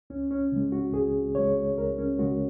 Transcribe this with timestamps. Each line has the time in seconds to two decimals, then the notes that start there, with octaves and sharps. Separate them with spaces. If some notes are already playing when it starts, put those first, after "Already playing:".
0.10 C#2 C#4
0.31 C#4
0.52 C#3 G#3
0.72 F#4
0.93 C#2 G#4
1.35 C#3 G#3 C#5
1.78 C#2 A#4
1.98 C#4
2.19 C#3 G#3 F#4